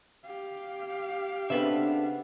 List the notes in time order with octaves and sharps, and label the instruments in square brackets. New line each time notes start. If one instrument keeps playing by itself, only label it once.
[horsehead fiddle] G4 F5
[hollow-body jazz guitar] C#3 B3 C4 [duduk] D4 [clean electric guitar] A4 B4 E5